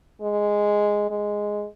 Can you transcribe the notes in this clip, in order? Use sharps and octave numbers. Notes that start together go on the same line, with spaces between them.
G#3
G#3